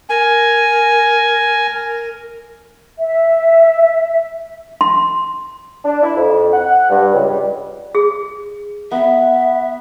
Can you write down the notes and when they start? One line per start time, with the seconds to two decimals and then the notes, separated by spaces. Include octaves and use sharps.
0.10 A#4 G#5
2.99 E5
4.81 C6
5.85 D4
6.03 E4
6.16 F2
6.53 F#5
6.90 G2
7.13 C#2
7.28 G3
7.95 G#4
8.92 B3 E5 B5